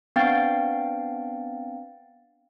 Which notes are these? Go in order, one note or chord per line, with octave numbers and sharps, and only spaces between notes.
B3 C4 D4 F5 G5 A6